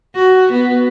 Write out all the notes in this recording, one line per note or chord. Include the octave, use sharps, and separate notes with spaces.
F#4
B3